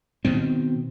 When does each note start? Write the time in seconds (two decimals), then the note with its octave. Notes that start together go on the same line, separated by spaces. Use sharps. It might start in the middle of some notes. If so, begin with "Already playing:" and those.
0.25 B2 D#3 C4